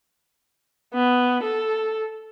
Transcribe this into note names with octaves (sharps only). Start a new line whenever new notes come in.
B3
A4